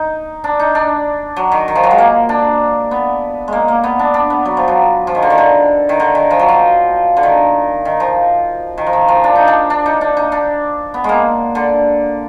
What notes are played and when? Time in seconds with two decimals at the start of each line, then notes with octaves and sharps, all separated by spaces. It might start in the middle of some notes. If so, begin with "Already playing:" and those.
Already playing: D#4
0.44 D4
0.59 D#4
0.75 D4
1.36 F#3
1.52 D#3
1.68 D#3
1.75 F3
1.83 F#3
1.91 G#3
1.98 A#3
2.29 D4
2.91 B3
3.48 G#3 A#3
3.68 A#3
3.84 B3
3.99 D4
4.14 D4
4.30 B3
4.45 F#3
4.57 F3
4.68 F#3
5.07 F3
5.15 D#3
5.22 D3
5.30 D#3
5.38 D3
5.89 D#3
6.00 D3
6.15 D#3
6.31 F3
6.40 F#3
6.49 F3
7.17 D3
7.23 D#3
7.85 D#3
8.00 F3
8.78 D#3
8.87 F3
8.93 D#3
9.08 F3
9.24 D4
9.36 D#4
9.48 D4
9.70 D4
9.86 D#4
10.01 D4
10.17 D#4
10.32 D4
10.94 B3
11.04 G#3 A#3
11.55 D3